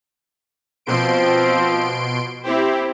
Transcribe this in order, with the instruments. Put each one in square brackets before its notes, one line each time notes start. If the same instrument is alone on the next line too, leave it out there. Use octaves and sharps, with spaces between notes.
[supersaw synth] B2 C6 D7 [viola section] F3 C4
[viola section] C4 C5 [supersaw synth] E4 G4